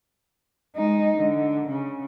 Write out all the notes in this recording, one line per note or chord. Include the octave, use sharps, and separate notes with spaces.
G#3 D#4
D3
C#3